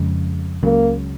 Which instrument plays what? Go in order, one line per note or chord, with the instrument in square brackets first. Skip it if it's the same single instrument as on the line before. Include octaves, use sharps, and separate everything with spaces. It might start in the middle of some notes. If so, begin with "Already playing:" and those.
Already playing: [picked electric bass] F2 C#3 G#3
[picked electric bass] C#2 C#3 F#3 [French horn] A#3